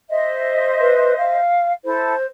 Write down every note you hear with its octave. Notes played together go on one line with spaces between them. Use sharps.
C5 D#5 E5
B4
F5
E4 A4 C5